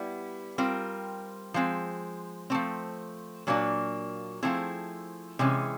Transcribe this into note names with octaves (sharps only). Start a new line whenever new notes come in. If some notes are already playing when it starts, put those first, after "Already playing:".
Already playing: G3 B3 E4
G3 C4 F4 A#4
F3 G#3 C4
F3 A3 C4
A#2 F#3 A#3 D4
F3 A3 C4 E4 G#4
C3 E3 G#3 C#4